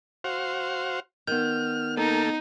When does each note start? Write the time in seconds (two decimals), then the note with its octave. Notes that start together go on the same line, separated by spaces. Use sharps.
0.24 F#4 C5 F5
1.27 D#3 B3 F6 G6
1.97 A#3 D#4 A4